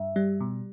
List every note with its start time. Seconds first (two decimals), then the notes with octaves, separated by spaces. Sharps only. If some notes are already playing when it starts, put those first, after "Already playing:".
Already playing: G2 E5
0.16 G3
0.41 B2